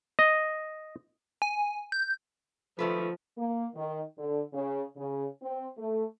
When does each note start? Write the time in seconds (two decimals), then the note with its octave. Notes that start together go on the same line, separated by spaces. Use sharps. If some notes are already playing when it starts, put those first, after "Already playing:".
0.19 D#5
1.42 G#5
1.92 G6
2.79 D#3 F3 A3 B4
3.38 A#3
3.75 D#3
4.17 D3
4.53 C#3
4.96 C#3
5.42 C4
5.77 A3